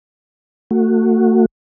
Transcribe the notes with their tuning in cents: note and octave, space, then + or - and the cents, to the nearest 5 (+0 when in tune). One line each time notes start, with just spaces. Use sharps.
A3 +35 F#4 -5